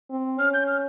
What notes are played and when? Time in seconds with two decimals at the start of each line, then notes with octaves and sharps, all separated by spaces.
0.10 C4
0.38 C#4 F6
0.54 G6
0.67 F6